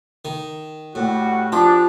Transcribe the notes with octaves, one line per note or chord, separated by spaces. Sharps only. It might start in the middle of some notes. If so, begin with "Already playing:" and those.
D#3
A2 G3 F#4
F3 D4 G4